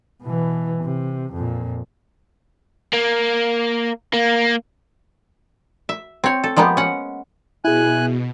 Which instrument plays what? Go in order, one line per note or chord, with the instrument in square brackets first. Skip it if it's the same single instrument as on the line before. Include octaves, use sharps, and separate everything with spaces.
[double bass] B2 E3
C3
F2 A#2
[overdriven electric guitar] A#3
A#3
[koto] E5
C4 C#5
A4
F3 G#3 A#3 B3 G4
C#4 F#5
[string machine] B2 [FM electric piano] E4 G#4 [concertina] G#5 F#6